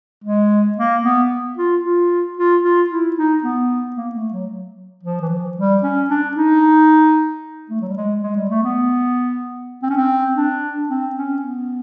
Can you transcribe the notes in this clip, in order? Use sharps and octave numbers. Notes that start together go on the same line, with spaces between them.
G#3
A#3
B3
F4
F4
F4
F4
E4
D#4
B3
A#3
A3
F#3
F3
E3
F3
G3
C#4
D4
D#4
A3
F#3
G3
G#3
G#3
G3
A3
B3
C4
C#4
C4
D4
C4
C#4
B3